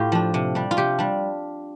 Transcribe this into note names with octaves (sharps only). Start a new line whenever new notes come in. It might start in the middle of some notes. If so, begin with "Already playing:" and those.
Already playing: A2 F4 G4
F3 D4
C3
G3 D4
F4
C3 G4
G3 D4